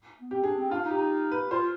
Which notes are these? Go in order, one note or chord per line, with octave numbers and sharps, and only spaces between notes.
B3
C4 G4
D4 G#4
C4
D4 F4
D#4
G4
D#4
B4
F4 C5